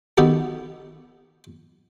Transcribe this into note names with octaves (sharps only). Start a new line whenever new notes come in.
D#3 B3 D#4 F#4 G4 A4